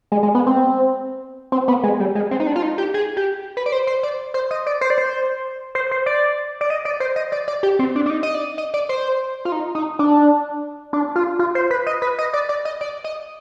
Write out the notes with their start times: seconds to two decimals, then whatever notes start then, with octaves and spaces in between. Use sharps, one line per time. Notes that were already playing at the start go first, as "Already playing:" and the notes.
0.12 G#3
0.23 G#3
0.35 B3
0.47 C4
1.52 C4
1.68 B3
1.83 G#3
2.00 G3
2.15 G#3
2.31 C4
2.40 D#4
2.47 D4
2.56 F4
2.62 D#4
2.78 G4
2.94 G#4
3.17 G4
3.57 B4
3.66 D5
3.72 C5
3.87 C5
4.03 D5
4.34 C5
4.51 D#5
4.67 D5
4.81 C5
4.90 D5
4.98 C5
5.75 C5
5.91 C5
6.06 D5
6.61 D5
6.70 D#5
6.85 D5
7.00 C5
7.16 D#5
7.32 D5
7.48 D5
7.63 G4
7.79 C4
7.96 D4
8.06 D4
8.10 D#4
8.23 D#5
8.34 D5
8.58 D#5
8.74 D5
8.89 C5
9.45 F4
9.52 D#4
9.75 D#4
9.99 D4
10.93 D4
11.16 F4
11.39 F4
11.55 C5
11.71 B4
11.87 D#5
12.02 B4
12.19 D#5
12.33 D5
12.49 D5
12.65 D#5
12.81 D5
13.04 D#5